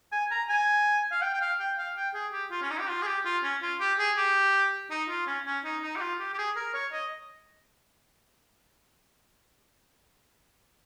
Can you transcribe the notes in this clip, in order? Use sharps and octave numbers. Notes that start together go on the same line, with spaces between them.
G#5
A#5
G#5
F5
G5
G5
F5
G5
F5
G5
G#4
G4
F4
C#4
D#4
G4
F4
G#4
G4
F4
C#4
F4
G4
G#4
G4
D#4
F4
C#4
C#4
D#4
D#4
G4
F4
G4
G4
G#4
A#4
C#5
D#5